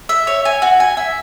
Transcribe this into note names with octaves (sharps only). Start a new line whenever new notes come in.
E5
C#5
G#5
F#4
G#5
E5